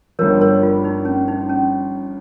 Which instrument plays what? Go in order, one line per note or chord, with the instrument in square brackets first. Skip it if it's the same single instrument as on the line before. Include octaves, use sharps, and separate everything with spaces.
[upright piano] G1 G2 F3 [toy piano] A#4 C#5
[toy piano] A#4 C#5
F4
D#4
C#4
D#4
C#4